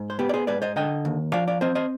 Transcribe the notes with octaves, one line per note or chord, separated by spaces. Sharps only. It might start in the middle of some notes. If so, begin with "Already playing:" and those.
Already playing: G#2
C5
B3 G4 B4
D5
G#4 C5
G#2 B4 D5
C5 D#5
D3 D#5 G5
D#2
F3 D5 F5
D5 F5
C4 C5 D#5
C5 D#5